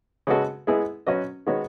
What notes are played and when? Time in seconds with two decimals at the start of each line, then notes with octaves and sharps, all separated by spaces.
0.27 C#3 G#3 B3 F#4 A4
0.67 G#3 B3 E4 G#4
1.07 F#3 C#4 F#4 B4 D#5
1.46 D#3 G#3 B3 F#4 C#5